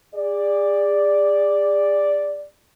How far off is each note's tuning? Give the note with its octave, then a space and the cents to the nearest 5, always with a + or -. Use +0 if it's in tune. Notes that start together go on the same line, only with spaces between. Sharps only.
G#4 -35 D5 +0